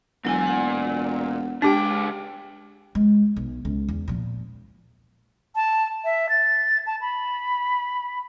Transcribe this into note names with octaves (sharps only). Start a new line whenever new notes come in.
E1 A#2 F#3 E4 G#5
F#5
C#2 G#3 D4 G4 G5 D6
G#3
B1
C#2
E2
A#2 F3
A5
E5
A6
A5
B5